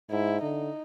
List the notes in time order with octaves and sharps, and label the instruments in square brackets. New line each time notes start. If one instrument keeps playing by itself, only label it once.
[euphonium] G#2 [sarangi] E4
[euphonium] D3 [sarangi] D#4